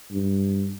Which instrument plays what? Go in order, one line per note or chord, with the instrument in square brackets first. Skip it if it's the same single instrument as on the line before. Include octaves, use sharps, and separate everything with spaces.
[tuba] G2